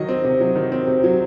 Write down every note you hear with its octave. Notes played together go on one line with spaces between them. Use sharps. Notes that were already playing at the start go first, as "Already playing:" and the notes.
Already playing: D#3 F#3 D#5
C4
C3
F#3
D#3
C4
C3
F#3